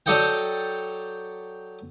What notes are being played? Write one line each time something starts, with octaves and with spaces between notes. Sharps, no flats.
F#3 A4 D5 D#5 F#5 G5